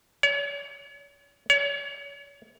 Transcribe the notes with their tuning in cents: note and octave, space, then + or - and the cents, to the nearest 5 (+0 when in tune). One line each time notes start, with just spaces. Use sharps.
C#5 +40
C#5 +35